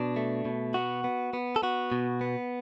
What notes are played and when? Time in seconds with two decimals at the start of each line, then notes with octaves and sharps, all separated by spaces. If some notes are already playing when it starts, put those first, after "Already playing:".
Already playing: B2 D4
0.16 A3
0.45 B2
0.74 B3 F#4
1.04 B3
1.33 B3
1.56 A4
1.62 B3 F#4
1.92 B2
2.21 B3